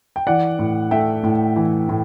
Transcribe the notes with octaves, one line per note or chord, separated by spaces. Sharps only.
G5
E3 D5 F#5
A2
A3 E5 G5
A2
E3
A2